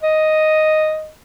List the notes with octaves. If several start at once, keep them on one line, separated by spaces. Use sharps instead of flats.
D#5